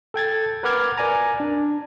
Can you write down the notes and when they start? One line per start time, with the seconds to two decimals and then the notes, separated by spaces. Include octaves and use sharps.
0.14 A4 G5 G#6 A6
0.63 A#4 B4 F#5 D6 F6 G#6
0.97 A#4 D5 G#5 A#5
1.40 D4